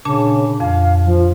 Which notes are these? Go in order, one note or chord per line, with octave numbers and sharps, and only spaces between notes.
A#2 C#3 D4 A5
F2 F5
F3